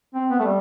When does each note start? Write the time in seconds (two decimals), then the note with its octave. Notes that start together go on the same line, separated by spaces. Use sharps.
0.14 C4
0.30 B3
0.40 A3
0.44 G3